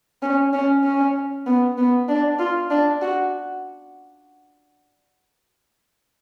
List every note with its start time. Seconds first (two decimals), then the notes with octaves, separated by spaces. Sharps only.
0.22 C#4
0.53 C#4
0.84 C#4
1.47 B3
1.78 B3
2.09 D4
2.39 F4
2.70 D4
3.02 F#4